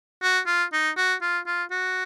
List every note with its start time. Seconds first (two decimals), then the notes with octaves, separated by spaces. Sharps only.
0.22 F#4
0.47 F4
0.73 D#4
0.97 F#4
1.22 F4
1.46 F4
1.71 F#4